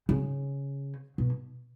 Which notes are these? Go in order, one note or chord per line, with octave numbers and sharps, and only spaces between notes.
C#3
B2